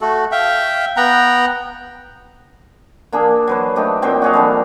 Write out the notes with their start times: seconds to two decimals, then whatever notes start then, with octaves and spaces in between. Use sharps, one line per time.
0.01 A3 F#4 A4
0.32 E5 F5 G5
0.97 B3 F#5 G5 A#5
3.12 A#3 D4 G#4
3.47 F#3 B4 C5
3.76 A3 D4 D#4 G4
4.02 A#2 F#3 C4 G5
4.22 F#4 G#4 F5
4.33 D3 F3 G3